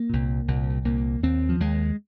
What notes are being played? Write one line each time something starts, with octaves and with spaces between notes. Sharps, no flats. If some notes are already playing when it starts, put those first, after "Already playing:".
Already playing: A#3
C2 A#2
C2 A#2
C2 A#2 A#3
D#2 C4
F3
D#2 G#3